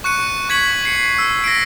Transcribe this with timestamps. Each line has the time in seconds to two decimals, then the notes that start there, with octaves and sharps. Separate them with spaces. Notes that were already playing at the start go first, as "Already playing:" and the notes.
0.04 C#6 F#6 C#7 D#7
0.49 C#6 G#6 B6 C#7 F#7
0.85 C7 C#7
1.18 E6
1.44 A#6 C7 D7